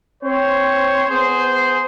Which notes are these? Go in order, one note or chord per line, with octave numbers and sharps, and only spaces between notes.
C4 C5 C#5
B3 G#4 C5